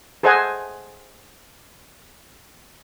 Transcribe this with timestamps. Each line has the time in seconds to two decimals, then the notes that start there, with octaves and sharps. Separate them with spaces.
0.23 G#4 A4 C5 D#5 F#5 G#5